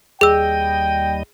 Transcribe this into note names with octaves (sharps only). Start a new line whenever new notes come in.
D#2 G3 G#4 D#5 G5 E6